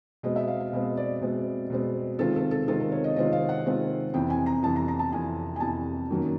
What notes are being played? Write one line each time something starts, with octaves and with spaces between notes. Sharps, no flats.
B2 G#3 C4 D#5
E5
F5
F5
B2 G#3 C4 D#5
D5
B2 G#3 C4
B2 G#3 C4
C3 D#3 G#3 C4 F4 A4
A4
A4
C3 D#3 G#3 C4 F4 A4
A#4
C#5
D#5
C3 D#3 G#3 C4 F4 D#5
F5
F#5
C3 D#3 G#3 C4 F4
F2 C3 E3 G5
G#5
A#5
F2 C3 E3 A5
A#5
A#5
A5
F2 C3 E3 G#5
G#5
F2 C3 E3 A5
F#2 D#3 F#3 A#3